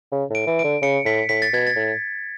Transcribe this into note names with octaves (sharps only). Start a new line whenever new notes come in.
C#3
A2 D7
E3
D7
D3
C#3 C#7
A2 B6
A2 B6
A6
B2 G#6
A6
A2